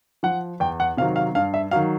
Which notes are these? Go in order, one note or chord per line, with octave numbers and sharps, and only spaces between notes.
F3 F#5
E2 G5
F#5
C3 D#3 F#3 F5
F5
G2 F5
E5
D#3 F#3 F5